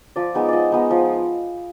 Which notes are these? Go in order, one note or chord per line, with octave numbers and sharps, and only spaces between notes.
F3 D5
G#3 B3 D#4
F3 D5 D#5
G#3 B3 D#4
F3